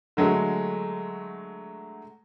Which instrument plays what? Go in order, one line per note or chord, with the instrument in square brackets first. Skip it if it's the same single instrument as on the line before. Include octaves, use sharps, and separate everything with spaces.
[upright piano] D3 F#3 G#3 A3